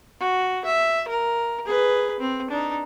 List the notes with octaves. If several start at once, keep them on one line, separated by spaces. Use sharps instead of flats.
F#4
E5
A#4
G#4 B4
C4
D4 D#4